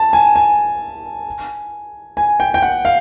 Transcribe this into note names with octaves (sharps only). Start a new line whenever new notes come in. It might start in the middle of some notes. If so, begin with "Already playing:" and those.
Already playing: A5
G#5
G#5
G#5
G5
G5
F#5
F5